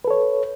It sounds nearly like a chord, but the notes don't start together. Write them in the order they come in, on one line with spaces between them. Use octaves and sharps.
B4 A4 C#5